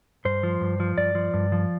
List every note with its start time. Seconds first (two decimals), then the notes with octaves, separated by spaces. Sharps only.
0.25 G2 C5
0.43 F3
0.61 G2
0.80 F3
0.97 G2 D5
1.15 F3
1.34 G2
1.52 F3